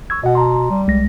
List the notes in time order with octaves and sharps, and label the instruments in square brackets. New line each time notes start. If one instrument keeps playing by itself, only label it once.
[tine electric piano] C#6 E6 G#6
[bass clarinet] B2 [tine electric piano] D#5 F#5
[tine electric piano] A5 A#5 C6
[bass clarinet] G3
[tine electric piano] C2 G#3 A#6